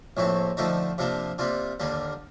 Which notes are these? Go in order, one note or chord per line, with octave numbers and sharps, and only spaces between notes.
A#1 A2 A3 C4
D3 F3 A3 D#4
C3 F3 A#3 D4
C3 G3 A#3 F4
D#2 D3 G3 A#3